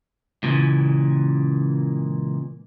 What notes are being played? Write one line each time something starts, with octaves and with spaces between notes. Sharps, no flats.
C#2 A#2 C#3 E3